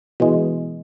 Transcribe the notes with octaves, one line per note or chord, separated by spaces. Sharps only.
B2 E3 G#3